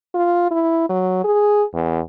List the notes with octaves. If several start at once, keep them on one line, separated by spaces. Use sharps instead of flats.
F4
E4
F#3
G#4
E2